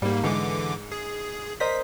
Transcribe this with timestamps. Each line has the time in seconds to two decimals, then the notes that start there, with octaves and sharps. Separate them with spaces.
0.02 G#2 G3 A#3
0.23 G#2 D3 E3 D6
0.92 G#4
1.60 A#4 C5 D#5 B6